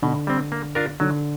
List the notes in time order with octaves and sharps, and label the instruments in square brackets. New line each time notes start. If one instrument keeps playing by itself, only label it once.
[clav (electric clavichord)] B2 [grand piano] D3
[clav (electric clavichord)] G3 C4
A#3
D4 F4 A#4
[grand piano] D3 [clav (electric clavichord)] F#3